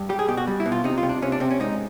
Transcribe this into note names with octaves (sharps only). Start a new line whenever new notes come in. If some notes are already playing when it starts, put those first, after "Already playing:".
Already playing: G2
G3 G4
G#4
B2 G4
F#4
G3
E4
B2
F4
C3 D#4
F4
C3
D4
C3 C#4
D4
C3 C4
C#4
G#2 D#4